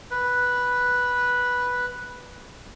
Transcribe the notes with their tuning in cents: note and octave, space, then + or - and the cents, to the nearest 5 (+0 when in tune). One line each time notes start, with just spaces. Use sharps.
B4 -5